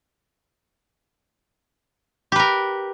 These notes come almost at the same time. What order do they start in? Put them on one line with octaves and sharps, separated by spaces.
G4 B4 A#4